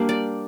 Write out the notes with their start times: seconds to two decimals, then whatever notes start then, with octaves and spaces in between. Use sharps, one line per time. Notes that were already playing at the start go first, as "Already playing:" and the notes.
Already playing: G3 A#3 D4
0.09 D5